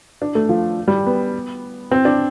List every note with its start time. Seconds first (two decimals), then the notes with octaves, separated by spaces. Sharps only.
0.22 D4
0.35 A3
0.49 F3
0.88 G3
1.06 B3
1.91 C4
2.05 D4